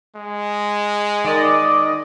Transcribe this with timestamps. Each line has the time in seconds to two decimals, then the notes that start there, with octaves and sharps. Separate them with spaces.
0.16 G#3
1.24 D#3 D5 D#5